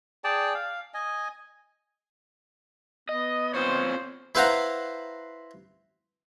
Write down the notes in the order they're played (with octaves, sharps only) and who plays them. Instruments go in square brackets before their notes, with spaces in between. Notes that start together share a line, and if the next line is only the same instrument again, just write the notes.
[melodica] G#4 D5 G5 A5
F5
D#5 G#5
[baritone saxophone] B3 [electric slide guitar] D#5
[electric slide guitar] C4 F4 C#5 [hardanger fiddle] C5
[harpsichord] E4 B4 C5 F5 F#5 A#5